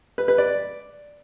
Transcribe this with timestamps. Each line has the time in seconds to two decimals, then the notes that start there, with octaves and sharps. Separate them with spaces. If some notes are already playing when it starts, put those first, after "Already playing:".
0.18 B4
0.28 B4
0.38 D5